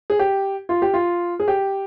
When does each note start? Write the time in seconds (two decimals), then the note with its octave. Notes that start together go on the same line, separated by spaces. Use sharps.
0.10 G#4
0.19 G4
0.69 F4
0.82 G4
0.94 F4
1.40 G#4
1.48 G4